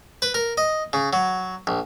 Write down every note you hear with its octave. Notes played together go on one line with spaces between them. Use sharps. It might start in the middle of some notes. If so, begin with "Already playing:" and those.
B4
A#4
D#5
C#3
F#3
A#1